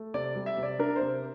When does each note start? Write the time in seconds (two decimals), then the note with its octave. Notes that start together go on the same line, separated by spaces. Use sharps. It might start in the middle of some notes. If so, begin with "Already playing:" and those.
Already playing: A3
0.14 C3 D5
0.36 G3
0.46 E5
0.57 C3
0.63 D5
0.79 D4 A#4
0.96 C5
1.01 C3